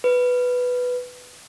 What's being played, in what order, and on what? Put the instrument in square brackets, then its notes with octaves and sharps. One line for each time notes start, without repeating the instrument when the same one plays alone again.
[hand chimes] B4